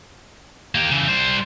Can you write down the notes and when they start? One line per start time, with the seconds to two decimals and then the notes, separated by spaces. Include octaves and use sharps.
0.75 A#3 G4
0.91 C#3 E3
1.07 G3 C5